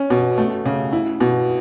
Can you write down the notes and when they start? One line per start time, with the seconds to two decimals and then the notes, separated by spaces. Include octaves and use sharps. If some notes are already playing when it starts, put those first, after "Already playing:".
Already playing: C#4
0.10 B2
0.38 A3
0.65 C#3
0.93 E4
1.20 B2